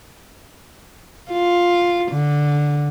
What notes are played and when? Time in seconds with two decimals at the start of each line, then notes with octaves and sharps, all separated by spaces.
1.31 F4
2.12 D3